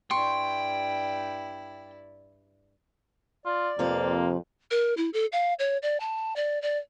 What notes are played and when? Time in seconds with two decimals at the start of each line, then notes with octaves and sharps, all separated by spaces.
0.11 G2 E4 D5 G5 C6 C#6
3.46 F4 D5
3.79 F2 C3 F3 A#3 B4
4.71 A#4
4.97 E4
5.14 A4
5.32 F5
5.59 C#5
5.82 D5
6.00 A5
6.36 D5
6.62 D5